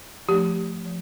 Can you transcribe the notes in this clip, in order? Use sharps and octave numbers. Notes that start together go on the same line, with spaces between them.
F3 A3 D4 G4
F3